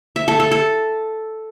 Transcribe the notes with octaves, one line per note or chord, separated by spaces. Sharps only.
E5
A4
A4
A4